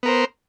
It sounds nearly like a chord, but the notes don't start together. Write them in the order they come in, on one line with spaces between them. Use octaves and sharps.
B3 A#4 C5